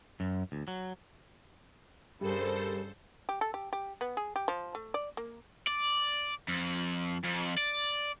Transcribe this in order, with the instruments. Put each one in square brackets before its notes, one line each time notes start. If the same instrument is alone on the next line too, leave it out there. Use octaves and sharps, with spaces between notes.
[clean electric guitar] F#2
D2
F#3
[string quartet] G2 C#3 [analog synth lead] G3 [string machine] A4 C5 [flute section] A#4 B5
[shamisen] G4
A4
G4
G4
B3
G#4
G4
F3
A3
D5
A#3
[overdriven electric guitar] D5
F2
F2
D5